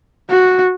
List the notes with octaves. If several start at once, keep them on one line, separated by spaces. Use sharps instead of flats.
F#4